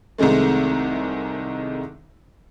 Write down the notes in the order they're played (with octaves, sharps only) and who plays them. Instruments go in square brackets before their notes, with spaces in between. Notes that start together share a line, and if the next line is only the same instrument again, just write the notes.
[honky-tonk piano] C2 C3 D#3 G#3 A3